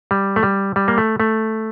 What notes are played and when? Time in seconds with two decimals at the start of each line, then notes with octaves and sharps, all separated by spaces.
0.11 G3
0.36 A3
0.43 G3
0.76 G3
0.88 A#3
0.98 A3
1.20 A3